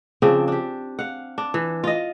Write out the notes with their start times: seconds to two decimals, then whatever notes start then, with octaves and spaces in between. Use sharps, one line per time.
0.22 C#3 F3 C4 D4
0.48 D4 G4
0.99 F5 F#5
1.38 D4
1.54 E3
1.84 F4 D#5